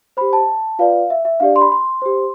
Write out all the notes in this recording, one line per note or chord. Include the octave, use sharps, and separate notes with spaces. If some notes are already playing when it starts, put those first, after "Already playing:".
G4 C5 B5
A5
F4 B4 D5 F5
E5
E5
D4 G4 D5 F5
C6
B5
C6
G4 C5